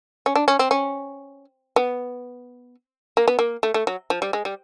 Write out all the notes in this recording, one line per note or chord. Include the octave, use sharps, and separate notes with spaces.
C#4
D4
C#4
C4
C#4
B3
A#3
B3
A#3
A3
A3
F#3
F3
G3
G#3
G3